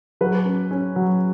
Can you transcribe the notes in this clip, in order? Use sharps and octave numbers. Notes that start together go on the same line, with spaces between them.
F#3 B4
C#4
C#4
F#3